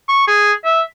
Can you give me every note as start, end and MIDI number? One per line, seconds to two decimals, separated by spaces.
0.08 0.24 85
0.27 0.52 68
0.65 0.82 76